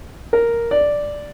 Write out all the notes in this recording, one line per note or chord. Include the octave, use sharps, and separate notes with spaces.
A#4
D5